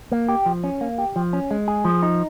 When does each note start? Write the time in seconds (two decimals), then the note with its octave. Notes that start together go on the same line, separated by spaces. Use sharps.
0.12 A#3
0.29 G4
0.46 F3
0.64 C#4
0.81 A#3
0.98 G4
1.16 F3
1.33 C#4
1.51 G#3
1.68 G#4
1.85 F3
2.03 D#4